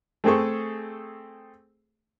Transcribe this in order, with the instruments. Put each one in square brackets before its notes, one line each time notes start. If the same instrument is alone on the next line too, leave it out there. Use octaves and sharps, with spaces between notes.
[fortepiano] A3 C4 G#4 A4 C#6